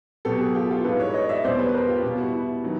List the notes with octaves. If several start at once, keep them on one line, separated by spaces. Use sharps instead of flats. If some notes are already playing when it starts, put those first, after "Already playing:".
B2 F#3 G4 A4
F#4 G#4
F4 G4
F4
G#2 E3 G3 A4 B4
B4 C#5
C#5 D#5
D5 E5
E2 B2 G3 C5 D5
B4 C#5
B4
A#4 C5
F4 G4
B2 G3
E4 F#4
E4
D#3 F#3